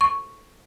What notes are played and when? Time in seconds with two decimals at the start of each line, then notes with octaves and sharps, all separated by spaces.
0.01 C#6